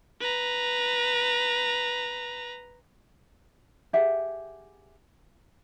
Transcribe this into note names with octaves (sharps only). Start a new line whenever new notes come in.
B4 A#5
G4 G#4 E5 F#5